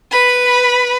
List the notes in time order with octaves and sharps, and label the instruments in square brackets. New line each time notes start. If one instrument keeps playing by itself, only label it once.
[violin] B4 B5